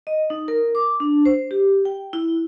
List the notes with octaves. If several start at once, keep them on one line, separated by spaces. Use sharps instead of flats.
D#5
D#4
A#4
D6
D4
C5
G4
G5
E4